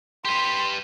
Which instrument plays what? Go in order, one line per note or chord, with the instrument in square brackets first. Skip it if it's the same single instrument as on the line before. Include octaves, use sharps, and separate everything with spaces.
[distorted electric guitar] G4 B4 [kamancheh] C6